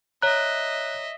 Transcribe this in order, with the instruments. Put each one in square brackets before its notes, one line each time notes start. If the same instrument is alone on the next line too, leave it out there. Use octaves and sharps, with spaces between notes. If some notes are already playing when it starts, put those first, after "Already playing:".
[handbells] C#5 A#5 [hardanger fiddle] D#5 E5 [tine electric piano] F#6